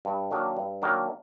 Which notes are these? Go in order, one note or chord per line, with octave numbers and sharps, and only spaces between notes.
G2
D#3 F#3 A#3 D4
G2
D#3 F#3 A#3 D4